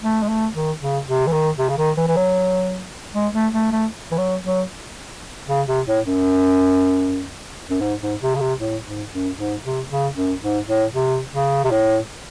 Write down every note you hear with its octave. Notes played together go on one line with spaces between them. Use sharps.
A3
G#3
A3
D#3
C#3
C3
E3
D#3
C3
C#3
D#3
E3
E3
F#3
G#3
A3
A3
A3
E3
F#3
F#3
C#3
C3
A2
F#2
F#2
G#2
G#2
C3
C#3
C3
A2
G#2
F#2
G#2
C3
C#3
F#2
G#2
A2
C3
C#3
C3
A2